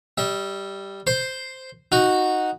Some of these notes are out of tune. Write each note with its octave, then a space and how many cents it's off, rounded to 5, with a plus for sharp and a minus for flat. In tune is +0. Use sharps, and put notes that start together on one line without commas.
G3 +0 E5 -40
C5 +0 C6 +0
D#4 +0 F#4 -5